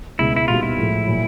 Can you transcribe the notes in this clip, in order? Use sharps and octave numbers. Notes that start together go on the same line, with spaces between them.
C#2 B2 G#3 E4
E4
A#2 G3 B3 D#4 F4 F#4
E4
A2 F3 G#3
A#2 F#3